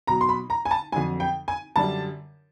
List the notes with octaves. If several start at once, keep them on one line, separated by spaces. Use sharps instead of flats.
B2 F#3 A#5
C6
B5
A#5
G#5
A5
F2 D3 F#3 G#5
G5
G#5
F#2 D3 G3 A5